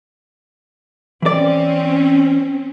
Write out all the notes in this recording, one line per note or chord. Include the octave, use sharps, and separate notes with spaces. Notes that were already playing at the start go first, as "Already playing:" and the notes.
E3 C4 C#4 D5